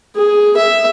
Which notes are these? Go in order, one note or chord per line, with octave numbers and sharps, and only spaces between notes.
G#4
E5